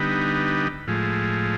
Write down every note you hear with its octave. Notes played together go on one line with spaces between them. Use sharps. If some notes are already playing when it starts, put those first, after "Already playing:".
Already playing: D3 G3 B3 D#4
A2 F3 G#3